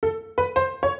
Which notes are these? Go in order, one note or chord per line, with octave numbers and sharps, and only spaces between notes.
A4
B4
C5
C#5